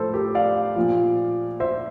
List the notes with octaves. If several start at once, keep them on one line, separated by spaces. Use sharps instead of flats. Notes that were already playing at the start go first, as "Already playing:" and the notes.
Already playing: A2 F3 A4 C5
G4 A#4
D5 F5
A#2 F3
C5 E5